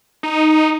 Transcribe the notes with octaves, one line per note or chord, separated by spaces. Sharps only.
D#4